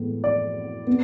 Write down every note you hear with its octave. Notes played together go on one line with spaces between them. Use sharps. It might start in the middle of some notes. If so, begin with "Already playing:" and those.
Already playing: A2 E3 G#3 B3
D5
B3